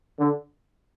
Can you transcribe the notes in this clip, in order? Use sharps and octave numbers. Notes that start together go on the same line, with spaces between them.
D3